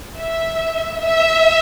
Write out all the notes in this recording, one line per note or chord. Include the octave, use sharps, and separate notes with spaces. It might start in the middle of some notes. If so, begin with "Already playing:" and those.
E5
E5